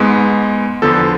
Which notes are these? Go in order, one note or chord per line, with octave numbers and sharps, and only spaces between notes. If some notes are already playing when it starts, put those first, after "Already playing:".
Already playing: G#2 G#3 B3
E2 D3 F3 B3 A4